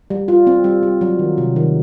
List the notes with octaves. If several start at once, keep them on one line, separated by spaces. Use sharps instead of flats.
G3
F4
C4
G3
G3
F#3
D#3
C3
D#3